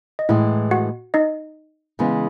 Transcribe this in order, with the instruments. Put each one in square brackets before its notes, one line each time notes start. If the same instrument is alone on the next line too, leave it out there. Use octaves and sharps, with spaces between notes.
[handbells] D#5
[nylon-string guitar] A2 E3 G#3 [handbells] E4 E5
[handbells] F#4 F#5
D#4 D#5
[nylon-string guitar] C#3 E3 G#3 B3